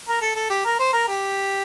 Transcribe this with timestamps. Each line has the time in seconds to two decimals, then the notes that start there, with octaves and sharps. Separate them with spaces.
0.08 A#4
0.21 A4
0.36 A4
0.50 G4
0.65 A#4
0.79 C5
0.93 A#4
1.08 G4